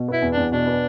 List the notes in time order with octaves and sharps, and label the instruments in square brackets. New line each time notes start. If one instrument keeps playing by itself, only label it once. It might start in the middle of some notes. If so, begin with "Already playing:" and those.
Already playing: [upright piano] B2
[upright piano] B3 [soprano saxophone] E4
[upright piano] E2
[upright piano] E2 [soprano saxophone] D4
[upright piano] B2 [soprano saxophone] D4
[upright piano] B3